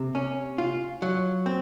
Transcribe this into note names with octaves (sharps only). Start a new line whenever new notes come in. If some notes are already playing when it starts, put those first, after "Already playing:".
Already playing: C3
C#4
F4
F#3
C4